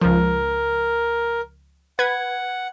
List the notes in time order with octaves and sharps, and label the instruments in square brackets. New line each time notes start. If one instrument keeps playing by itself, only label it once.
[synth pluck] C#2 F3 [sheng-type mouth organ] A#4
[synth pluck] B4 G#6 [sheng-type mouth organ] F#5